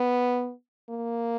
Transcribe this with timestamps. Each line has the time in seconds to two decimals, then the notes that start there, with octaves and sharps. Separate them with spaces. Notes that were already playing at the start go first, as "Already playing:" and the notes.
Already playing: B3
0.90 A#3